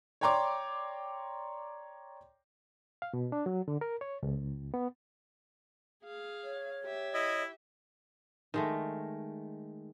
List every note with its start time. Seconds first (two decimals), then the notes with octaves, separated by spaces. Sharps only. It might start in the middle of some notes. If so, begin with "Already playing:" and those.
0.21 C#5 D5 G5 A#5 C6 D6
3.02 F5
3.13 B2
3.32 D4
3.46 F#3
3.68 D3
3.81 A#4
4.01 C#5
4.23 C#2
4.74 B3
6.04 G#4 F5
6.44 C#5
6.84 G4 E5
7.14 E4 D#5
8.54 D#3 G#3 A3